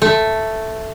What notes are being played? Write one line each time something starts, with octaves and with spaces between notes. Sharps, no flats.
A3